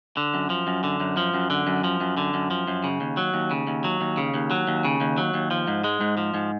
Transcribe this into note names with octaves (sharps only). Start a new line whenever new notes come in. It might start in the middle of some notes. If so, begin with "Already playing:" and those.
D3
F#2
F3
F#2
D3
F#2
F3
F#2
D3
F#2
F3
F#2
D3
F#2
F3
F#2
C#3
D#2
F#3
D#2
C#3
D#2
F#3
D#2
C#3
D#2
F#3
D#2
C#3
D#2
F#3
D#2
F3
G#2
G#3
G#2
F3
G#2